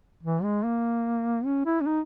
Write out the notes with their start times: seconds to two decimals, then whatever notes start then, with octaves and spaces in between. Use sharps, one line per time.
0.23 E3
0.43 G#3
0.63 A#3
1.45 C#4
1.66 E4
1.81 C#4
1.86 D#4